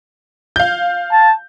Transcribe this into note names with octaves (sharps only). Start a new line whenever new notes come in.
F5 G6
A5